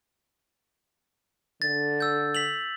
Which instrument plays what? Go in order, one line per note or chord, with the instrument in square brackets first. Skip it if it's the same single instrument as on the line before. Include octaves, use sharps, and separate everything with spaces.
[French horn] D3 [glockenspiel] A6
[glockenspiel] E6 G6
B6 F7 F#7